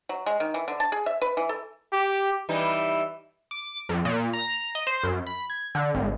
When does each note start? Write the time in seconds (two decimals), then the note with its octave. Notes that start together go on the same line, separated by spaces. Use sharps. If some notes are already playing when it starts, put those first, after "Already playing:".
0.09 F#3
0.26 G#3
0.40 D#3
0.54 E3
0.68 D3
0.80 A5
0.92 G#4
1.06 E5
1.22 B4
1.37 E3
1.49 A4
1.93 G4
2.49 E3 G3 D#4
3.51 D6
3.89 F2
4.05 A#2
4.33 A#5
4.75 D#5
4.87 C5
5.03 F#2
5.27 B5
5.50 G#6
5.75 D3
5.95 G#1